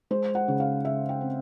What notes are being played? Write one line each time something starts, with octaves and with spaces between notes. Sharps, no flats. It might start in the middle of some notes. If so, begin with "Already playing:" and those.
G#3 C5
F#5
C#3
F5
C#3 E5
G5
C4